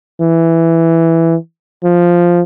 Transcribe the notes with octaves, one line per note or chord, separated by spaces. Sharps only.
E3
F3